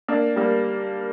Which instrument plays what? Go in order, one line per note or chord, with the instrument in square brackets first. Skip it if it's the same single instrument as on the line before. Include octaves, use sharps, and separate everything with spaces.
[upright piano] A#3 D4
G3 A#3